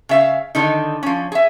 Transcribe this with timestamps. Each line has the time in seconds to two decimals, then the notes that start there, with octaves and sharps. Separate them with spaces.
0.09 C#3 E5 F5
0.55 D3 D#3 D#4
1.03 F3 C#4
1.32 G#4 E5